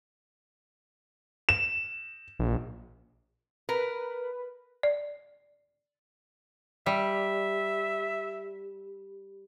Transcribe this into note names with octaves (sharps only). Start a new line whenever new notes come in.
E7
A#1
A#4 B4
D5
G3 E5